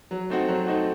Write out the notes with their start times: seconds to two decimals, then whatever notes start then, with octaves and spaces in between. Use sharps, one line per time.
0.11 F#3
0.30 A3 C4 D#4 F#4
0.48 F#3
0.66 A3 C4 D#4 F#4